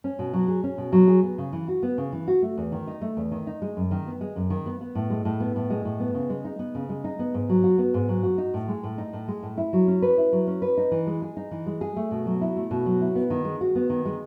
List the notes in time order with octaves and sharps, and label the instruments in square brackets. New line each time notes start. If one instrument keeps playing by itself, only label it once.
[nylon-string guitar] C#4
B2
F#3
G#4
C#4
B2
F#3
G#4
B3
C#3
E3
F#4
B3
C#3
E3
F#4
A3
E2
D#3
D#4
A3
E2
D#3
D#4
G#3
F#2
D#3
B3
G#3
F#2
D#3
B3
B3
A2
G#3
A2
B3
A2
G#3
A2
B3
C#3
G#3
D#4
B3
C#3
G#3
D#4
B3
G#2
F#3
F#4
B3
G#2
F#3
F#4
D#4
A2
G#3
A2
D#4
A2
G#3
A2
E4
F#3
C#4
B4
E4
F#3
C#4
B4
D#4
E3
G#3
G#4
D#4
E3
G#3
G#4
A3
B2
F#3
E4
A3
B2
F#3
E4
B3
D#3
G#3
F#4
B3
D#3
G#3